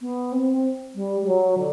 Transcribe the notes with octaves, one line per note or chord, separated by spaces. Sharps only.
B3
C4
G3
G3
F#3
D3